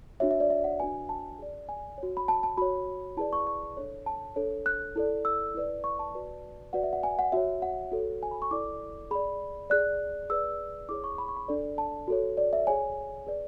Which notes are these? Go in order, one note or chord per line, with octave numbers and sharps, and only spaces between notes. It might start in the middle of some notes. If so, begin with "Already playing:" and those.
D4 F#4 C#5 E5
E5
D5
E5
F#5
D4 F#4 B4 G#5
A5
G#4 D5
G#5
C#5
F#4
B5
A5
A5
F#4 C#5 B5
E4 G#4 B4 D5 A5
C#6
C#6
D4 A4 C#5
A5
D4 A4 C#5
F#6
E4 A4 D5
E6
E4 B4 D5
C#6
A5
F#4 B4 D5
F#4 B4 D5 F#5
E5
F#5
G#5
F#5
F#4 C#5 E5
F#5
F#4 A4 C#5
G#5
B5
C#6
E4 A4 D5 D6
G#4 D5 B5
G#4 D5 F#6
G#4 B4 D5 E6
E4 G#4 C#5 D6
C#6
B5
C#6
B5
D4 A4 D5
A5
F#4 A4 C#5
D5
E5
G#4 C#5 G#5
G#4 B4 D5